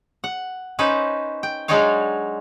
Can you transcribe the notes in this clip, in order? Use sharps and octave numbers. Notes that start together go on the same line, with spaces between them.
F#5
C#4 D#4 B4 C5
G5
F#3 G#3 D4 D#4 C#5 F5